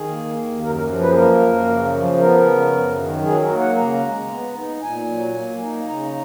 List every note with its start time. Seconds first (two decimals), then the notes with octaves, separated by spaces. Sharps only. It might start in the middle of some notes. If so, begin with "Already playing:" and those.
Already playing: D#3 G#4
0.09 A#3
0.36 D#2
0.62 F#2 A#4
0.75 A#4
0.88 F3
1.01 B4
1.10 G#4
1.14 A#3 A#4
1.41 F#2
1.68 C#3
1.93 F3
2.19 B3 A#4
2.46 C#3
2.72 F#2
2.99 D#3
3.24 F#3 G#4
3.42 A#4
3.50 A#3
3.59 F#5
3.77 C#3 A#5
4.04 G#3
4.30 B3
4.56 D#4
4.82 A#2 G#5
5.09 F#3
5.34 A#3
5.61 D#4
5.87 C#3 A#5